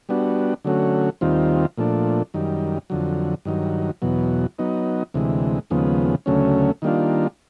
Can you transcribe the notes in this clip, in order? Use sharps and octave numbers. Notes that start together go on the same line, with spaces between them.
G3 B3 D4 F#4
D3 F#3 A3 C#4 F#4
D#2 D#3 G3 C4 F4
A#2 F3 A3 D4
F#2 D#3 G3
F2 D3 F#3
G2 D#3 F#3
E2 B2 F#3
F#3 B3 D#4
D2 C3 E3 G#3
D#2 C#3 F3 G#3 B3
D2 C#3 F#3 A3 C#4
D#3 G3 A#3 D4 F4